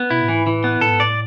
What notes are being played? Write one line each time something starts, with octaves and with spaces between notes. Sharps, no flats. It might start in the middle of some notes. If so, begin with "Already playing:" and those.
Already playing: B3
B2 E4
A2
G#2 E3
A2 E3
B3
A2 A4
G#2
A2 D5